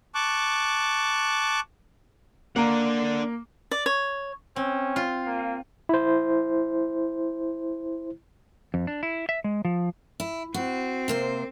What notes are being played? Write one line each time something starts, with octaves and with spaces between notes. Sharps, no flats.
A5 C#6 D6 F#6
A#3 D4 F#5 A#5
D5
C#5
C4 C#4
F4
A#3
E4 C5
F2
D4
E4
E5
G#3
F3
E4
C4 F#4
C3 A#3 C5